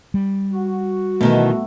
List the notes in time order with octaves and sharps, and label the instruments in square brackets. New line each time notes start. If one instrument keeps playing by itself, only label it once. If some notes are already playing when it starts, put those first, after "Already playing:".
[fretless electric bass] G3
[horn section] F#4
[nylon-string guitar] B2 D#3 E3 [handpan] A3 B3